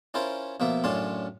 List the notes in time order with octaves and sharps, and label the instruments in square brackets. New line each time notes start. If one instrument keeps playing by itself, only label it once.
[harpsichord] C#4 E4 F4 A#4 C5
B2 F3 A#3 E5
F#2 A2 C#4 D4 F4 C6